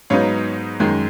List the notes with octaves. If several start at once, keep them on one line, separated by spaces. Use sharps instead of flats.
G#2 F#3 B3 D#4 C#5 F5
F#2 D#3 G#3